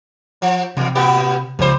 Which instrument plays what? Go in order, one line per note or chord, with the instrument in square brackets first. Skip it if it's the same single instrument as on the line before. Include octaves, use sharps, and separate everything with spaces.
[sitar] F3
[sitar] E2 [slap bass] C3
[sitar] A2 B3 G4
[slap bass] C#2 F3 [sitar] G2 C5